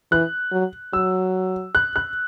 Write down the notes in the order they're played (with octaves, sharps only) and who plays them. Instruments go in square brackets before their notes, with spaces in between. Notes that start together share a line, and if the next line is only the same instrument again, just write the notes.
[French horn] E3 [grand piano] F#6
[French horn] F#3
[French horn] F#3 [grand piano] E6
[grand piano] F#6
F#6